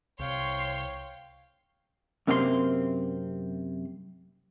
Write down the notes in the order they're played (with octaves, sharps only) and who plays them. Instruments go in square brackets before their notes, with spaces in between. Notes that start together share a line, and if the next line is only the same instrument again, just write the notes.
[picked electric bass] C2 [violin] C#5 C6 [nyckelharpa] F5 G5
[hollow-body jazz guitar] F#2 C3 A#3 C4 G#4 C6